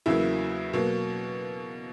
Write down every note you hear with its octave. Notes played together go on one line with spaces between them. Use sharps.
E2 C#3 F#3 A#3 E4
B2 F#3 A#3